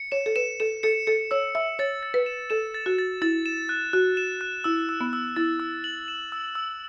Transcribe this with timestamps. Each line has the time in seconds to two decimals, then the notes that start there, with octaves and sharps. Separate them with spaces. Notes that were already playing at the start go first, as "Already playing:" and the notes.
Already playing: C#7
0.12 C#5 E7
0.26 A4
0.36 B4 E7
0.60 A4 E7
0.83 A4 C#7
1.07 A4 C#7
1.31 C#5 E6
1.55 E5 E6
1.79 C#5 A6
2.03 A6
2.14 B4
2.26 E7
2.50 A4 E7
2.74 A6
2.86 F#4
2.98 A6
3.22 E4 A6
3.46 E7
3.69 F#6
3.93 F#4 F#6
4.17 E7
4.41 F#6
4.64 E4 E6
4.89 E6
5.01 B3
5.13 E6
5.36 E4 A6
5.60 E6
5.84 F#7
6.08 E7
6.32 E6
6.55 E6